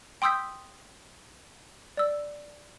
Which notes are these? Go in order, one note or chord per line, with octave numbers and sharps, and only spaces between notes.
G5 C6 D#6 E6 G6 B6
D5 E6